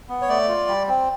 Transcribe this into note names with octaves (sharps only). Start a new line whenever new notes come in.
B3
C#5
A3 D5
F4
G3
C4